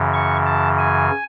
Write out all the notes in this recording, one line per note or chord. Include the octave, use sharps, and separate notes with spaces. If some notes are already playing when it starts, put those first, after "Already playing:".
Already playing: F#2 C#3 E3
C#6
A5
G#5